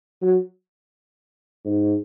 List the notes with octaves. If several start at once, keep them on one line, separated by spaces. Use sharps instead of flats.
F#3
G#2